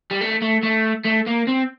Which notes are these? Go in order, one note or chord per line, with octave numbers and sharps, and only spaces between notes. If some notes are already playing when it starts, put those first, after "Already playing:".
G3
A3
A3
A3
A3
A#3
C4